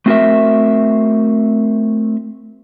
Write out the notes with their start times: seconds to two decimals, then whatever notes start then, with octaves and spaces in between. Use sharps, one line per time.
0.06 A3 C4 F#4 G4 A#4 E5